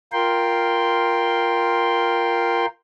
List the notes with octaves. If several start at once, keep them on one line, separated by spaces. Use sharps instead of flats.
F4 A#4 G5 C6